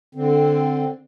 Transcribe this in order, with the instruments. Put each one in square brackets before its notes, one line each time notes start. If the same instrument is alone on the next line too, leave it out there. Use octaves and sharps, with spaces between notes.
[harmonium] D3 C4